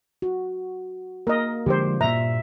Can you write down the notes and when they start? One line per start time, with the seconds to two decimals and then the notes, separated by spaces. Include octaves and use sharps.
0.22 F#4
1.27 A#3 A#4 D#5
1.66 D3 F3 G#3 G4 C5
2.01 G2 A#2 E5 A#5